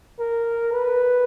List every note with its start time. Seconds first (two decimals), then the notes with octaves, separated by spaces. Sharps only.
0.19 A#4
0.72 B4